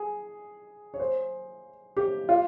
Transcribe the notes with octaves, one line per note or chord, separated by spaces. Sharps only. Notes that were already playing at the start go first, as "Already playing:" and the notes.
Already playing: G#4
C#5
C5
G4
F4